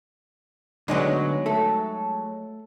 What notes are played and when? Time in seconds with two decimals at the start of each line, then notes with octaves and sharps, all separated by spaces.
0.88 D3 F#3 G#3 B3 D#4
1.46 A3 A4